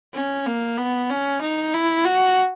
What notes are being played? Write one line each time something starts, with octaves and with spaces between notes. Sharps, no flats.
C#4
A#3
B3
C#4
D#4
E4
F#4